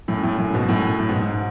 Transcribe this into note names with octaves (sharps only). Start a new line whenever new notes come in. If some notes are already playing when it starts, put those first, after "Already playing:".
F#2 A2
F#2 A2
F#2 A2
G#2 B2
F#2 A2
F#2 A2
G#2 B2
G#2